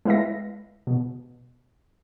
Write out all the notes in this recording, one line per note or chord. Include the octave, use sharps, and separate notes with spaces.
G#3 E4 B4 E5 F5 A#6
B2